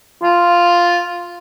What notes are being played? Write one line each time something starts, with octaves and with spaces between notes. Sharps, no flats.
F4